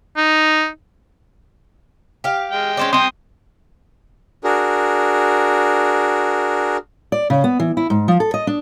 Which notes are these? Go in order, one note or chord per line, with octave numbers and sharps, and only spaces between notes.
D#4
G4 F5
G#3 G5
C#4 C5 D5
C4 G5 C6 D#6
D4 F#4 G#4 A#4
D5
C#3
B3
E3
E4
G#2
F3
A4
D#5
D4